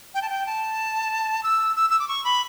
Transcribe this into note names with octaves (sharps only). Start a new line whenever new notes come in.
G5
A5
G5
A5
E6
E6
E6
D6
C#6
B5